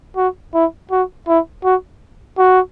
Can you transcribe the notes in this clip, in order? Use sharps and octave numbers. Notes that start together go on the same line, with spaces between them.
F#4
E4
F#4
E4
F#4
F#4